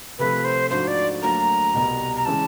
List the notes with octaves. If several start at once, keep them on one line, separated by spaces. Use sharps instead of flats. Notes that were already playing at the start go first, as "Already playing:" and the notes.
C3 F3 A3 B4
C5
G#2 F3 A3 D4 F#4 C5
D5
D2 D3 F#3 A#3 D4 A#5
C2 B2 G3 B3
A#5
C#3 E3 G#3 A5